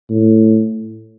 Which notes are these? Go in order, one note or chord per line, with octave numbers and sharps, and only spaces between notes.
A2